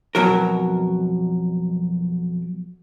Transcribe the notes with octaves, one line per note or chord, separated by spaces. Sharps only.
F2 B2 F#3 A#4